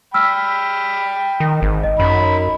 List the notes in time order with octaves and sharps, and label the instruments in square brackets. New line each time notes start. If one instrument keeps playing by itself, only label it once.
[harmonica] G5 B5 [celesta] E6 F6 B6
[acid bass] D#3
G#1
[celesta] D#5
[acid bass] F#2 [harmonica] D#4 B5